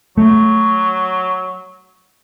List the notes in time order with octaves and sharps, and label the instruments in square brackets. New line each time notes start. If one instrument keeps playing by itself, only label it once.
[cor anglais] F#3 [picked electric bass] A3